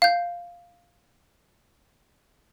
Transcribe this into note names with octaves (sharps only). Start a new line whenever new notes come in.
F5 G6